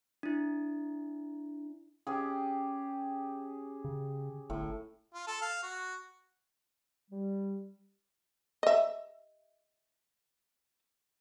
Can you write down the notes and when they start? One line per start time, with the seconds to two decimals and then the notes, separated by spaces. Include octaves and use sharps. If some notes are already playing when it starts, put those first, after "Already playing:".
0.23 D4 E4
2.07 C#4 G4 G#4
3.84 C#3
4.50 G1 A2
5.14 F4
5.27 A4
5.42 F5
5.63 F#4
7.10 G3
8.63 D#5 E5